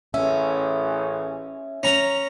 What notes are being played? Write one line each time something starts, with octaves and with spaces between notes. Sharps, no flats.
A1 E3 C#4 G#4 E5
C#4 A#5